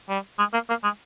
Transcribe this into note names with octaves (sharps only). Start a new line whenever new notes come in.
G3
G#3
A#3
A#3
G#3